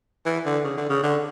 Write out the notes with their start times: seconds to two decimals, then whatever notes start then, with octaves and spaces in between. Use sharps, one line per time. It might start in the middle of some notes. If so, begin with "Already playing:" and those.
0.26 E3
0.46 D3
0.64 C#3
0.77 D3
0.90 C#3
1.03 D3